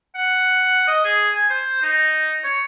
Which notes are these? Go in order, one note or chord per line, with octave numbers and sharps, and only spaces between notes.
F#5
D#5
G#4
G#5
C5
D#4
C#5